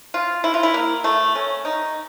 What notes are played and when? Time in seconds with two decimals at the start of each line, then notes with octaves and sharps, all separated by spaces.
0.14 F4
0.44 E4
0.54 F4
0.63 E4
0.74 A#3
1.04 A3
1.35 C#4
1.65 D#4